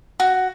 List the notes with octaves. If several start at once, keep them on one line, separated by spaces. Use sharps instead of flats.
F#4